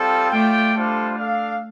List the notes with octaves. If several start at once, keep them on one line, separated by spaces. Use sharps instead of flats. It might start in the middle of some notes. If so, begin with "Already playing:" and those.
Already playing: G3 C4 F4 A4
A3 F4 D5 G5
G3 D4 F4 A4 C5
D4 A4 F5